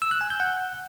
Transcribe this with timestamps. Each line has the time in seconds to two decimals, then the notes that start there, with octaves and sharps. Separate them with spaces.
0.02 E6
0.11 F#6
0.21 G#5
0.30 G6
0.40 F#5